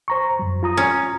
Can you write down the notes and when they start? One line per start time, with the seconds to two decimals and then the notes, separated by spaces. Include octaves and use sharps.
0.08 C5 A#5 C#6
0.39 F#2 F#3
0.63 F4 A#5 D#6
0.77 C#4